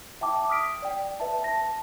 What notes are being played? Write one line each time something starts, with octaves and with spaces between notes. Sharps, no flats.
E5 G5 A5 D6
D#6 F6 B6 D7
D5 G5
B4 E5 A5
A5 A#6